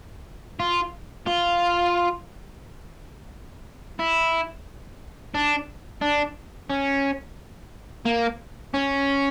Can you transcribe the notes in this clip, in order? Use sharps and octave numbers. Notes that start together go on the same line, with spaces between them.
F4
F4
E4
D4
D4
C#4
A#3
C#4